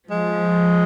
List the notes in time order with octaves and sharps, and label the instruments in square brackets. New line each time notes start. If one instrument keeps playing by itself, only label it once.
[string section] F3 [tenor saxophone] G#3